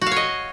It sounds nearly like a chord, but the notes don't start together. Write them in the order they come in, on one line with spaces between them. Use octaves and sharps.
F#4 F5 C#5 D#5